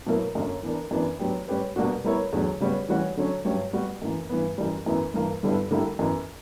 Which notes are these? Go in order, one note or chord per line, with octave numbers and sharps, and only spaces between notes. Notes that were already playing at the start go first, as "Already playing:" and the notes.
B2 F#3 A#3 E4 A#4
F#2 D3 A#3 C#4
E3 B3 D4 A#4
F#2 E3 B3 D4
F#3 B3 D4 G4
G3 C#4 G4 B4
B2 G3 A#3 D4 F#4
G3 B3 E4 A#4 C#5
E2 D3 F#3
C#3 G3 B3 F#4 C#5
E3 G3 C#4 F#4 C#5
D3 F#3 C#4
G2 F#3 C#4 G4 C#5
G3 B3 F#4
F#2 E3 A#3
G2 E3 B3
F#2 E3 G3
F#2 E3 B3 E4
G2 E3 A#3
G2 D3 G3 B3 E4
D3 G3 A#3 E4 G4
F#2 E3 B3